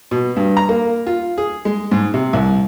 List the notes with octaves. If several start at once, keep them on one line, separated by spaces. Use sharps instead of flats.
B2
G2
A#5
A#3
F4
G#4
G#3
G#2
C3
C2